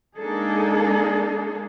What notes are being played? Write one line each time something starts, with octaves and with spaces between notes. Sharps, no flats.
G#3 A#3 D4 D#4 G#4 A4